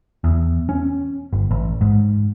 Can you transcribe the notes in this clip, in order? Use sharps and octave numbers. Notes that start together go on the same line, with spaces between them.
E2
C#4
G1
A1
G#2